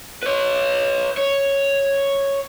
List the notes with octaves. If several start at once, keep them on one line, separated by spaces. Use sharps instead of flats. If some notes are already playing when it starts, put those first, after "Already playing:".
B4 C#5
C#5